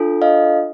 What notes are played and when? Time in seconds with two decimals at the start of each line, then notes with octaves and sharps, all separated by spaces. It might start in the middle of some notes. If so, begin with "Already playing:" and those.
Already playing: D4 F4 A4
0.22 D#5 F5